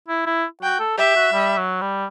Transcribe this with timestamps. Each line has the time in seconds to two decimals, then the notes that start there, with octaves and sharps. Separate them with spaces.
0.08 E4
0.26 E4
0.63 F#4 G5
0.80 A4
0.98 G4 E5
1.16 F#4
1.33 G3
1.57 F#3
1.81 G3